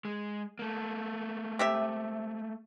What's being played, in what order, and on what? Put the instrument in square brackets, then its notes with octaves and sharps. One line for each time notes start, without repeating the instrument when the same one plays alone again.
[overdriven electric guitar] G#3
A3 A#3
[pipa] C3 G4 E5